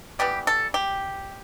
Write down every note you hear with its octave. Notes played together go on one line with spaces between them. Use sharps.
E3 G3 B3 G4
A4
G4